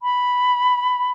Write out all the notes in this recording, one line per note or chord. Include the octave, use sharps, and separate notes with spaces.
B5